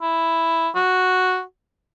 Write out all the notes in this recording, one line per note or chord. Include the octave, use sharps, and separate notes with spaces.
E4
F#4